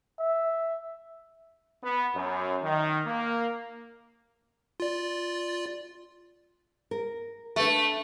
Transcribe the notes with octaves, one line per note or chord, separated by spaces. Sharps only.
E5
B3
F#2
D#3
A#3
F4 D5
A#4
A3 D4 B4 E5